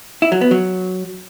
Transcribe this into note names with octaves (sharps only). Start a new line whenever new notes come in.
E4
F#3
B3
F#3